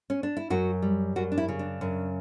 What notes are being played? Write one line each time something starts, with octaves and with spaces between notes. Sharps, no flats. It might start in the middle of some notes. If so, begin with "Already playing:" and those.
C#4
D4
E4
F#2 F#4
G3
F#2 F#4
D4
E4
C#3
D4
F#2